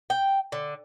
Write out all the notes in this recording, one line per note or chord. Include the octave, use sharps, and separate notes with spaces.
G5
D3